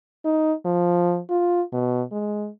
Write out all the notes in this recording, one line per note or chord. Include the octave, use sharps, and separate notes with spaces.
D#4
F3
F4
B2
G#3